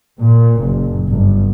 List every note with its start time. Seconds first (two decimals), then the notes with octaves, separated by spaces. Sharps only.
0.21 A#2
0.60 F#1
1.10 G1